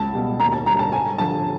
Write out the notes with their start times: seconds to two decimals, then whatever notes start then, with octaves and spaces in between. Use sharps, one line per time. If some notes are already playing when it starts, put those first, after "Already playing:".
Already playing: C#2 A5
0.12 B2 G3
0.39 D#2 A#5
0.52 A5
0.66 D3 G3 A#5
0.79 A5
0.92 G2 G#5
1.18 D3 F3 A5